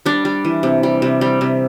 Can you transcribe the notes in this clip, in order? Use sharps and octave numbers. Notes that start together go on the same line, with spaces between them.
G3 D4
G3
E3
C3
G3
C3
G3
C3